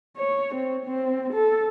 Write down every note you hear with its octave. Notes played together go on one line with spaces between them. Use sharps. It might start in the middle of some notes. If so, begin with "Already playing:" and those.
C#5
C4
C4
A4